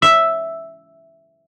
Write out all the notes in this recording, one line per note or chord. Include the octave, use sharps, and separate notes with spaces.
E5